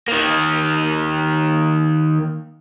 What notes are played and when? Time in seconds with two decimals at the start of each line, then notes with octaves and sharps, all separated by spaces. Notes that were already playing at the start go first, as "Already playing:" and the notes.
0.08 D#3 A#3